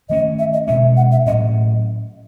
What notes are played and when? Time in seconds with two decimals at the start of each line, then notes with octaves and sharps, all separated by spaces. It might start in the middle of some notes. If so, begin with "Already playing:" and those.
0.09 D#3 A3 C#4 D#5
0.39 E5
0.53 D#5
0.67 B2 G#3 C#4 E5
0.97 F#5
1.12 E5
1.26 A2 F#3 C#4 D#5